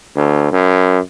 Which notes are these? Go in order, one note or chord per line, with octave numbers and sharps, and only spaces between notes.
D2
F#2